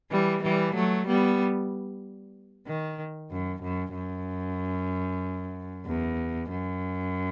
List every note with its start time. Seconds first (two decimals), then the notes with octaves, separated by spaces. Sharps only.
0.11 E3 G3
0.43 E3 G3
0.75 F#3 A3
1.07 G3 B3
2.67 D#3
3.31 F#2
3.63 F#2
3.94 F#2
5.86 E2
6.50 F#2